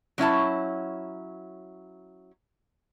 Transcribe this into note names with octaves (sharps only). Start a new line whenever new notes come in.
F#3 C#4 E4 A5